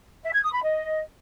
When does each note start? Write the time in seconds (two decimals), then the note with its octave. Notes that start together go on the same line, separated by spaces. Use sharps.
0.23 E5
0.33 G#6
0.43 D#6
0.52 B5
0.62 D#5